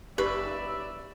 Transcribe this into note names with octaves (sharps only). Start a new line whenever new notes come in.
F#1 D#4 G4 B4 D5 E5